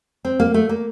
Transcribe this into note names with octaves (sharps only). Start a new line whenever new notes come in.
C4
A#3
A3
A#3